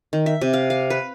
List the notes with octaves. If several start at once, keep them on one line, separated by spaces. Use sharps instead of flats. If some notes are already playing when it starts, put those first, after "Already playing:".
D#3
E5
C3
F5
F5
B4